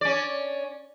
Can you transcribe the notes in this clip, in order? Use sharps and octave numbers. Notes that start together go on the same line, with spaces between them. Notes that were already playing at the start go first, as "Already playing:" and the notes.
C#4 D5